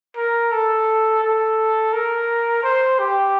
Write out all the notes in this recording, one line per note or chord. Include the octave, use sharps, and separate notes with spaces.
A#4
A4
A4
A#4
C5
G4